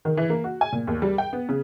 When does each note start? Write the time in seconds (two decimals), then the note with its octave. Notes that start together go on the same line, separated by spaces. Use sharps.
0.05 D#3
0.17 E3
0.30 A#3
0.44 F#4
0.61 G#5
0.73 A#2
0.87 D#2
1.02 G3
1.18 G5
1.33 B3
1.49 C#3